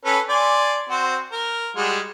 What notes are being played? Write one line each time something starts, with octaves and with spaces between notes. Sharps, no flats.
C#4 A4 B4
D5 G#5 C6
C4 F#4 C5
A#4
G3 G#3 F#4